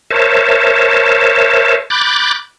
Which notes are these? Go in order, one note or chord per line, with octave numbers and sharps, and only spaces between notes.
A#4 C5 C#5 E5 A5
B5 D6 F#6 G6 A6